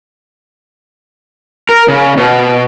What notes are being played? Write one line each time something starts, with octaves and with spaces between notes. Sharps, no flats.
A#4
C#3
B2